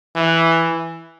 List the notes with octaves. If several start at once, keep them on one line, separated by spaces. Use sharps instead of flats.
E3